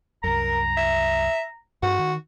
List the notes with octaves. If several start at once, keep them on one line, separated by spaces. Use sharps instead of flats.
C2 F#2 A#4 A#5
E5
G2 F#4
D#3